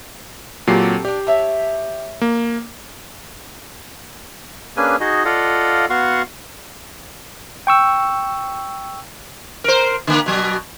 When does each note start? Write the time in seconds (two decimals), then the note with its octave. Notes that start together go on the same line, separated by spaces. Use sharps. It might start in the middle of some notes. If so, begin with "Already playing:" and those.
0.67 A#2 F#3 C4 G4 A4 C7
1.05 D4 G4 D5
1.27 C#5 E5 A5
2.21 A#3
4.77 A#3 C#4 D4 G#4 B4 G#5
5.00 D#4 F#4 G#4 D#5
5.25 F4 A4 D5 D#5 F5 F#5
5.90 B3 F#4 F5 F#5 C6 C#6
7.67 G5 C#6 E6
9.64 A#4 C5
10.07 D3 A#3
10.26 B2 F#3